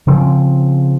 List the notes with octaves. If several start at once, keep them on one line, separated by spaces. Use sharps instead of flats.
C#3 F3 C4